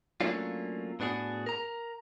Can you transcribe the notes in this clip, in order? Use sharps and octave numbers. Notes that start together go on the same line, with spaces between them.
F#3 A3 A#3 C#4 D4 F4
A2 B3 D4 F#4 G#4
A#4 A#5